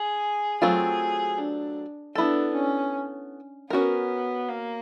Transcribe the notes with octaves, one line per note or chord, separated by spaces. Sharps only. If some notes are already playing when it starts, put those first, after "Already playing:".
Already playing: G#4
F#3 A3 C4 F4 G#4
D4
B3 D4 E4 A4
C#4
B3 C#4 F#4 A#4
A#3